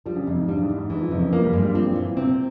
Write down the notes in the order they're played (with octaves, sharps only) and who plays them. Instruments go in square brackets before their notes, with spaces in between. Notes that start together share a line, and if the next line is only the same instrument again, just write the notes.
[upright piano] F3 [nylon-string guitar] G3
[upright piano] C#3
[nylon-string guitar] F2 [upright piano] C3
[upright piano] G#2
[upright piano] G2 [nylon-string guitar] G3
[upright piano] G#2
[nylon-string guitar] E2
[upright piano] G#2
[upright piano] G#2 [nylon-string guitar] E3
[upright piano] F3
[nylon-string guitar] F2 [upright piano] C3
[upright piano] C#3
[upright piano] F3 [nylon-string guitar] A#3
[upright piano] G3
[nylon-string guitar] G2 [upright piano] G#3
[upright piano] G3
[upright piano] F3 [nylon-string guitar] C4
[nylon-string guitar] A#2 [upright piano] E3
[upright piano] C3 [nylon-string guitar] C4